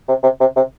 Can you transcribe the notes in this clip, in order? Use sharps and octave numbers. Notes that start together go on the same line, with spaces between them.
C3
C3
C3
C3